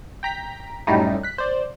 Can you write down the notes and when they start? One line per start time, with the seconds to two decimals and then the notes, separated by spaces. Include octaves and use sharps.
0.23 G5 A#5 B6
0.87 F#2 A2 G3 A3 D#4
1.23 F#6 B6
1.38 C5 D5